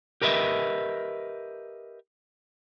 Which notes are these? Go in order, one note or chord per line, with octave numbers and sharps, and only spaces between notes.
G4 A#4 B4 D#5 E5